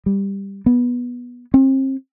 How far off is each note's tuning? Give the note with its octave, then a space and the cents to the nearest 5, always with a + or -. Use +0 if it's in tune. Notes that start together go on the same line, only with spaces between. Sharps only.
G3 +10
B3 -15
C4 +35